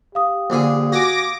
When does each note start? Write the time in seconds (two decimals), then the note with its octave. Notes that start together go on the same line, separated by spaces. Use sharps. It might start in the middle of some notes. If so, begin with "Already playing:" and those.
0.15 G4 F5 D#6
0.50 A#1 D3 G#4
0.92 F#4 G#5 D6 A#6